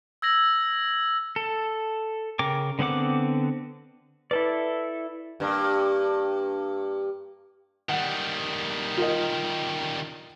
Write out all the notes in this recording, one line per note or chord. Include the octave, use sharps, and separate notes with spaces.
E6 G#6 A#6 F#7
A4
C#3 A#4 G5 D6
D3 B3 C4 F#5 D6
E4 A4 B4 D5
G2 A#3
D#3 G3 F#5
F4 A#4 D#5